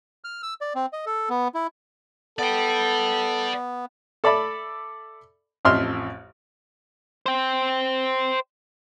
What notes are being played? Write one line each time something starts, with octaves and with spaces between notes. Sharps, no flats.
F6
E6
D5
C4
D#5
A4
B3
E4
B3 A4 D5 G5
A4 D5 E5 B5 D6
A1 F2 D#5 E5 C6 F6
C5 G5